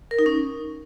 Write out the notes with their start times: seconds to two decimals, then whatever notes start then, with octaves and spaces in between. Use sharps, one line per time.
0.11 A#4
0.19 D#4
0.26 C#4